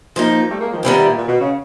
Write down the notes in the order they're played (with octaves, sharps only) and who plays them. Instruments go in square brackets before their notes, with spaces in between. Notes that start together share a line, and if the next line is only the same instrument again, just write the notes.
[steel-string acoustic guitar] F3 A#3 D#4
[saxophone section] G3 A3
G#3 A#3
D#3 F3
[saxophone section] C3 [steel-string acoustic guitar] D#3 G3 B3 E4 G4
[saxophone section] A#2
A#2
B2
C#3